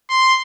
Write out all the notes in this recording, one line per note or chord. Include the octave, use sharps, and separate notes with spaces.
C6